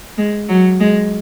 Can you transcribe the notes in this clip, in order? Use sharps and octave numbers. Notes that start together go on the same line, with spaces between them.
G#3
F#3
G#3